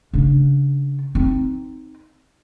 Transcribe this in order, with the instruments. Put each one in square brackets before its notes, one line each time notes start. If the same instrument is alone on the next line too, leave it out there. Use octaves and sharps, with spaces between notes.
[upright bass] C#3 D4
C4 D#4